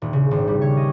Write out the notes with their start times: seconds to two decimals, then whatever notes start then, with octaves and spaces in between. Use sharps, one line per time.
0.02 D#1
0.13 C#3
0.31 G#1
0.47 G3
0.62 C#5
0.77 D#5